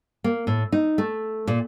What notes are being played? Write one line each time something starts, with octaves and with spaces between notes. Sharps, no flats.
A#3
A2
D#4
A3
A#2